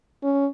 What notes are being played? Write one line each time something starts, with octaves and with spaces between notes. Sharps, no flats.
C#4